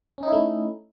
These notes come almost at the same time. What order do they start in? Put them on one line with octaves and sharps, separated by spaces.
C#4 D#4 E4 A3